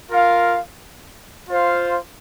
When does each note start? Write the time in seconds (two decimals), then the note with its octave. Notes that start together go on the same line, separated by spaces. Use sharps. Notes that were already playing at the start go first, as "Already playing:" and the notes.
0.12 F4 A#4 F5
1.49 F4 C5 F5